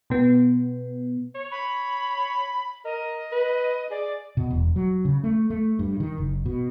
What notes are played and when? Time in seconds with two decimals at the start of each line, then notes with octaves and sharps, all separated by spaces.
0.10 B2 B3
1.35 C#5
1.51 B5
2.85 A#4 D#5
3.32 B4
3.91 G#4 D5
4.37 B2
4.50 E1
4.76 F#3
5.05 C#3
5.24 A3
5.50 A3
5.79 G2
6.00 D#3
6.18 F#1
6.46 B2